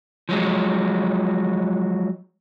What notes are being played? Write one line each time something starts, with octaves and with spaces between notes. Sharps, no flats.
F3 F#3 G#3